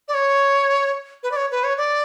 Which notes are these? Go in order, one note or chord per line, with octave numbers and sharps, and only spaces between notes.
D5
C#5
B4
D5
C#5
B4
C#5
D5